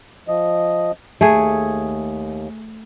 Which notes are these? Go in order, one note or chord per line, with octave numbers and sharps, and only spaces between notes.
F3 D#5
D#2 A3 G#4